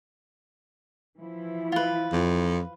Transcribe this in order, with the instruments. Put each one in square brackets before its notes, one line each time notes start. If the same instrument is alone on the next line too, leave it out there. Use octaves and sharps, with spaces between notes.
[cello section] E3 F3 E4
[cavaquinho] F4 B4
[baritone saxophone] F2